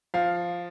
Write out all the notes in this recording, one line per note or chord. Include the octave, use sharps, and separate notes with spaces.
F3 F5